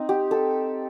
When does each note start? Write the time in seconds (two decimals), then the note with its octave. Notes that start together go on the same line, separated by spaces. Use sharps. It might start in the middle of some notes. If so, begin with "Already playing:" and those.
Already playing: C4 D#4
0.09 G4
0.31 A4